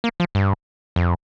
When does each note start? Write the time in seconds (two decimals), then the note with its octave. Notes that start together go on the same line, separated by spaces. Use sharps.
0.04 A#3
0.20 F3
0.35 G2
0.96 F2